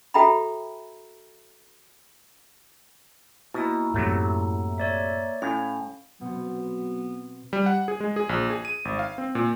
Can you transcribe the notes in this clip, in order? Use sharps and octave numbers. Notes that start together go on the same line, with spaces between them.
F#4 A4 E5 G5 A#5 B5
B2 A#3 E4 A#5 E6
F#2 A2 C3 F#3 A3
C#5 D5 E5
A2 C#4 F5
B2 F#3 B3 C4
G3
F#5
G#4
G#3
G#4
A#1
G#4
D#7
G#1
F5
C4
A#2